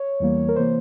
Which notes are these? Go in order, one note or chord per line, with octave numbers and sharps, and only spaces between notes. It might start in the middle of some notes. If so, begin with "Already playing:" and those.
Already playing: C#5
E2 E3 G3 A#3
A#4
C3 E3 A#3 C5